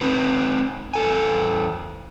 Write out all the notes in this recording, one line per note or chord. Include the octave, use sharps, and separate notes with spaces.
C4 D#4 B4
E2 A4 G#5